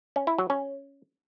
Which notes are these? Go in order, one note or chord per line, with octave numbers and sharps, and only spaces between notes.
C#4
E4
F#3
C#4